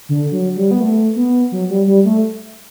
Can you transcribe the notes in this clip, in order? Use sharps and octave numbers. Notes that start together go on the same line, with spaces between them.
D3
F#3
G3
B3
A3
B3
F#3
G3
G3
A3